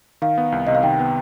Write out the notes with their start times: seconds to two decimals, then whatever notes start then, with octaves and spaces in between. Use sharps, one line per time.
0.22 D#3 F5
0.38 B3
0.52 C2
0.67 C3 D#5
0.75 F5
0.83 D#3 G5
0.99 B3